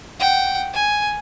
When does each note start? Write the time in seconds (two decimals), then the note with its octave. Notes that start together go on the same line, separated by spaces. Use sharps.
0.20 F#5 G5
0.73 G#5